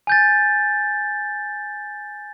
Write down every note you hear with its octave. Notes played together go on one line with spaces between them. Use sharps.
G#5 G6 A6